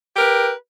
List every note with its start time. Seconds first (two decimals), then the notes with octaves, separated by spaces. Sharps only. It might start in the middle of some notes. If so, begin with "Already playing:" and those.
0.14 G4
0.17 A#4
0.19 B4